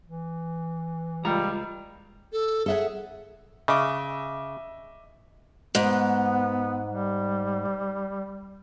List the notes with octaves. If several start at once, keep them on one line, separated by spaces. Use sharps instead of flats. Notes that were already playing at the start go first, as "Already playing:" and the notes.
E3
C#2 G3 F4 A#5
A4
G#4 A4 E5 F#5
C#3 D#5 E5 D6
G#2 B3
G3